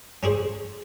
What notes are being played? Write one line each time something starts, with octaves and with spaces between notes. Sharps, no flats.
C#4 D4 G#4 C5